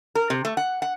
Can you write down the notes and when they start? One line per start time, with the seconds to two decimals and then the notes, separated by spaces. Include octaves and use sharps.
0.15 A#4
0.30 C3
0.45 A3
0.57 F#5
0.82 F#5